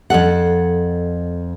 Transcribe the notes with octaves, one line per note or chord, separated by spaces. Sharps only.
F2 D#3 A4 F#5